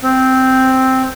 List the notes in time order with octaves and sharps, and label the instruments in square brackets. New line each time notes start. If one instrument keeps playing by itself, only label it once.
[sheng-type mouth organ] C4